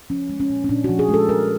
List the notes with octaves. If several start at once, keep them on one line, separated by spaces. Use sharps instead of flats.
F3 C#4
G#3
C#4
A#2
C#4
A#2 D4
F#4
F3
G#4
G#3
A4
G3 A#4